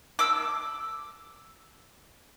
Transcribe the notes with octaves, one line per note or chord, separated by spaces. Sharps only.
D6 E6